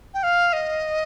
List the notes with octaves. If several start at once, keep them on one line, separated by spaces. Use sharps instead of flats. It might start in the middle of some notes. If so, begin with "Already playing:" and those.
G5
F5
D#5